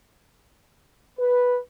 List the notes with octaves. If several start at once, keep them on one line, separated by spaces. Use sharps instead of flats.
B4